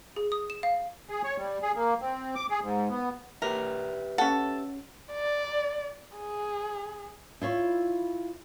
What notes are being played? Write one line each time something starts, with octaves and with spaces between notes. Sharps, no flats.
G#4
D#6
E7
F5
G#4
C#5
G3
G#4
A#3
C4
D6
G#4
G#2
B3
G4 A#4 B4 E5
C#4 A4 F#5
D5
G#4
E4 F4 C#5